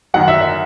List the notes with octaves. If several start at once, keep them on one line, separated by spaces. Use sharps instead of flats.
F#2 D#3 F#3 F#5
E5
E5